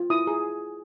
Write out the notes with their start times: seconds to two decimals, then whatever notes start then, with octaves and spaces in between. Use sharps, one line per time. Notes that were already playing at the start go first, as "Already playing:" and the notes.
Already playing: F4
0.10 E4 D#6
0.27 G#4